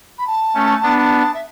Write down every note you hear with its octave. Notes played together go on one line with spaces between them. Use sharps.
B5
A5
A3 C#4
B3 D4
E5